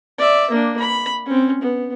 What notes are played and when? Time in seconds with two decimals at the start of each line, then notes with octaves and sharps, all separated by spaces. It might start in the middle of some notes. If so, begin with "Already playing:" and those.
0.18 D5 E5
0.51 A#3 D4
0.79 B5
1.25 C4 C#4
1.61 B3